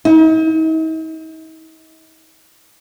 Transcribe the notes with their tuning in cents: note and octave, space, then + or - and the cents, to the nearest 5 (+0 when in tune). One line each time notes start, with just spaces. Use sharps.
D#4 +45